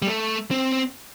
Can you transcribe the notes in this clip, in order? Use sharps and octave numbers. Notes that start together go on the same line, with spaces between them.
G3
A3
C4